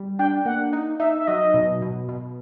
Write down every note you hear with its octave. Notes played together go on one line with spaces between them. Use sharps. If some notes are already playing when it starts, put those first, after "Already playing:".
Already playing: G3
D4 G5
A#3 F#5
D#4
D#4 E5
E5
F#3 D#5
B2
B2
B2